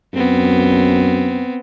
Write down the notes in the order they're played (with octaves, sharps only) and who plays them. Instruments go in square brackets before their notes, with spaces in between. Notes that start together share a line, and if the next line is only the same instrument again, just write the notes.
[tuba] F#2 [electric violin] B3 C4